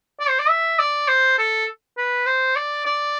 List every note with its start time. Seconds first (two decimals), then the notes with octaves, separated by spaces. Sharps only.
0.20 D5
0.29 C5
0.39 D5
0.49 E5
0.79 D5
1.08 C5
1.39 A4
1.98 B4
2.26 C5
2.56 D5
2.86 D5